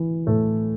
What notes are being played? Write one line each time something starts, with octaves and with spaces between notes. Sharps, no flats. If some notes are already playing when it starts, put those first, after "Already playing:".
Already playing: E3
A2 A3